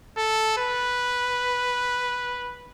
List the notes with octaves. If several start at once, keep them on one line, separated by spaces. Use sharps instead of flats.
A4
B4